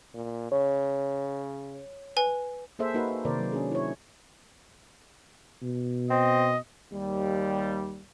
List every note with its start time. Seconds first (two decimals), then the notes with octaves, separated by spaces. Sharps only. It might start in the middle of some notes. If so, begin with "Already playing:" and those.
0.14 A#2
0.52 C#3 C#5
2.17 B4 G#5
2.79 A#3 G#4 A4 C5 E5
2.94 A#3 D#4 F#4 A#4 B4
3.25 C3 D#3 A#3 A#4 C5 D5
3.39 F#3
3.52 C#4 D4 G#4
3.71 E4 C#5
5.62 B2
6.11 C4 D#5
6.92 D#2 G3